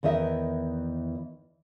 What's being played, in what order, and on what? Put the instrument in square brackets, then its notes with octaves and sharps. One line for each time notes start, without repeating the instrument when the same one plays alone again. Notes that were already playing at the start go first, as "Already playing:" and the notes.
[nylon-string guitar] E2 D#3 E3 D#5 E5